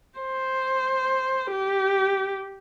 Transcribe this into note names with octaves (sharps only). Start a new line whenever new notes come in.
C5
G4